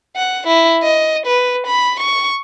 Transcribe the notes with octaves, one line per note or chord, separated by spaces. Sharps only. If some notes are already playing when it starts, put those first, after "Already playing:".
F#5
E4
D#5
B4
B5
C#6